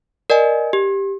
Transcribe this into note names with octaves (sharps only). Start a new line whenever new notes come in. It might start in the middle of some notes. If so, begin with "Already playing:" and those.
A#4 D5 D#5 G#5
G4